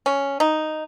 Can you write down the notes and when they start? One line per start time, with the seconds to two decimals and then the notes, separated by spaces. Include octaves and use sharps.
0.06 C#4
0.40 D#4